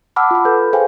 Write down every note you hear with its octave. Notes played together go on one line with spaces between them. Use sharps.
F#5 A5 B5 D6 E6 F6
F4 B5
A4 B4 G6
G#4 C5 F5 G5 G#5